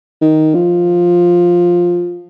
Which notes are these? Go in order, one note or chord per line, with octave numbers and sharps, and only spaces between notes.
D#3
F3